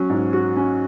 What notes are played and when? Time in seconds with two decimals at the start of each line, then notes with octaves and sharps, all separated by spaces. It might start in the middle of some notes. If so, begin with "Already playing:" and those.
Already playing: F#3 C#4
0.10 G#2
0.33 F#4
0.57 C#4